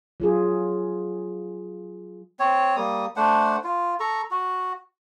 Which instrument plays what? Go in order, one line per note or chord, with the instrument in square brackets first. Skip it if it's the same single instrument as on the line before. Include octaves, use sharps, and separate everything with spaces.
[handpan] F#3 F4 G#4
[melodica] C4 C#5
G3 A#3 D#6
A3 D4 C5 F#5
F4
A4 A#5 C#6
F#4